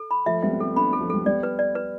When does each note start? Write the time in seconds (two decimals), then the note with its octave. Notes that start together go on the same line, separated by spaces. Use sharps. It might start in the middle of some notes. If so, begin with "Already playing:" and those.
Already playing: A4
0.11 B5
0.26 F3 A3 E5
0.43 G3 B3 E5
0.53 B3
0.59 A3 C4 A4
0.76 B3 D4 B5
0.93 A4
1.01 F3
1.10 G3 A4
1.26 G3 B3 D5
1.43 B4
1.59 D5
1.75 B4